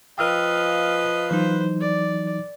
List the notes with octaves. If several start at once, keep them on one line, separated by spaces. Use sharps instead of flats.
F3 B4 D#5 F5 G5 E6 F6
E3 F#3 D#4 C5
D5